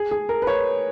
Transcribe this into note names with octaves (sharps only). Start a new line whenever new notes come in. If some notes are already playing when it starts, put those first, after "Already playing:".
Already playing: G#4
G#4
A#4
B4
C#5